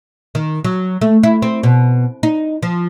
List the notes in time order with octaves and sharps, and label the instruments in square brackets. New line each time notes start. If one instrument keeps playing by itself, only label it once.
[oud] D#3
F#3
A3
E4
C4
B2
D#4
F3